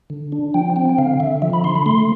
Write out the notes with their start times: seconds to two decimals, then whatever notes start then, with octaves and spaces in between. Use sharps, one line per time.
0.10 D3
0.32 D4
0.54 F3 G5
0.76 C4 G5
0.89 G5
0.98 D3 F5
1.20 D3 E5
1.42 F3 E5
1.53 B5
1.64 D3 C6
1.75 B5
1.86 A3 C6